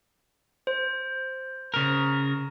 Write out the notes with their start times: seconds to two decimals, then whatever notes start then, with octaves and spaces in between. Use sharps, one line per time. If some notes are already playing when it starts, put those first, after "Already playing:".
0.67 C5
1.74 C#3 A#4